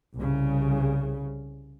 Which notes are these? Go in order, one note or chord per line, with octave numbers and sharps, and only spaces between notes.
C2 C#3